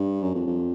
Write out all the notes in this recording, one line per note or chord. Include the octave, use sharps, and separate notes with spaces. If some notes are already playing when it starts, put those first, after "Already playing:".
Already playing: G2
F#2
F2
F2